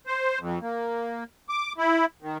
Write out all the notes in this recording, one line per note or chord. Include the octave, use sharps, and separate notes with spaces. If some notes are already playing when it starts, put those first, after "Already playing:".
C5
F2
A#3
D6
E4
D#3